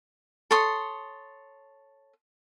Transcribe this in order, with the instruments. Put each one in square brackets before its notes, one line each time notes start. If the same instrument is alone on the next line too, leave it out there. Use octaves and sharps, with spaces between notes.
[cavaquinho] A4 C#5 C6 D#6